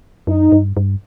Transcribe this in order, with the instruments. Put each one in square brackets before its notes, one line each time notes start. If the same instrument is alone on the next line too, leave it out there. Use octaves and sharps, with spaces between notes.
[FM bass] F#2 [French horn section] D#4
[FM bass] G2
G2